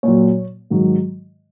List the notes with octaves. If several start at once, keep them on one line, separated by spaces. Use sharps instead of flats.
A#2 F#3 C#5
G#2 D#3 F#3